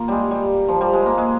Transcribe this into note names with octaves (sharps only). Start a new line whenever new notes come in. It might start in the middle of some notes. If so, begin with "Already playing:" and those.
Already playing: A#3 F4
G3 G#3
G3
F3
G3
G#3
A#3
G#3